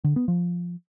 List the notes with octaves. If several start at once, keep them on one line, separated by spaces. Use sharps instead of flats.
D3
B3
F3